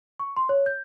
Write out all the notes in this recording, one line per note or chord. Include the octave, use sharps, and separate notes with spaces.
C#6
C6
C#5
G6